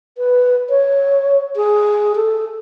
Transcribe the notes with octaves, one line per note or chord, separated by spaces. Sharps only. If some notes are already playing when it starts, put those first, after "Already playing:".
B4
C#5
G#4
A4